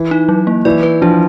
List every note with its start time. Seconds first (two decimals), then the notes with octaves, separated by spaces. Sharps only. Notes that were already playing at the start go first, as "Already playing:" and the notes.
Already playing: E3
0.11 D#4
0.29 F#3
0.47 A#3
0.65 E3 D5
0.83 B4
1.02 F3 D4